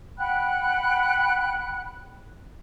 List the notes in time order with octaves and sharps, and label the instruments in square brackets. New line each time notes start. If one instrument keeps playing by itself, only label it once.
[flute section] F#5 G5 B5 F#6